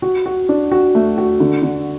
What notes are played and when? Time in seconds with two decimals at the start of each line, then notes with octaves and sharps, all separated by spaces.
0.02 F#4
0.26 F#4
0.49 D4
0.72 F#4
0.95 A3
1.18 F#4
1.40 D3
1.63 D3